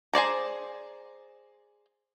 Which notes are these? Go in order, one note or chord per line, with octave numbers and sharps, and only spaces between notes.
G#4 C5 D5 A#5